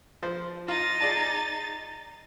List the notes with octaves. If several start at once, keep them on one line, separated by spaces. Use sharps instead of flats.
F3 C5
D#4 F4 A6
G#4 D5 A5